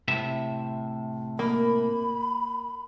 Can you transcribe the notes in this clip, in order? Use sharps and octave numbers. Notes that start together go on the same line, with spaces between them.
A2 C3 E5
A#3 B5